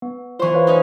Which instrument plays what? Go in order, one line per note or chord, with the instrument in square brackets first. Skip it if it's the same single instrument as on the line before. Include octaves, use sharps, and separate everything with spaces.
[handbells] B3
[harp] E3 C5 [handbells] F4 C#6
[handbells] B4 C#5 F5
[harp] C#4 D#4